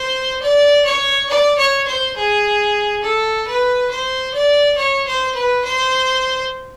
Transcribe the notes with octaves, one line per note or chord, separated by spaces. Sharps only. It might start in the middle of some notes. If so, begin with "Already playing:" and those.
Already playing: C5
D5
C#5
D5
C#5
C5
G#4
A4
B4
C5
D5
C#5
C5
B4
C5